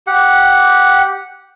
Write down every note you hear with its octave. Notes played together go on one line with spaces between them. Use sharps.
G4 F#5